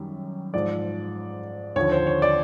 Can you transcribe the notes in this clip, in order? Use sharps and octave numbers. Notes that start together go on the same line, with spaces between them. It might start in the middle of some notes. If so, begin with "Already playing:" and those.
Already playing: F#2 D#3 G3
G#2 F3 D5
D#2 D3 F3 C#5
C5
C#5
D5